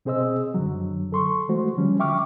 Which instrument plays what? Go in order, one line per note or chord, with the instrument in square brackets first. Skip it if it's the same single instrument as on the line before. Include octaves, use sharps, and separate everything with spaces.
[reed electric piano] B2 C4 G#4 C5 D#5 E6
F#2 D3 F#3
A4 C6 C#6
E3 G#3 A3 F#4 C5
D3 F3 G3 C#4
E5 G5 C#6 D6 F6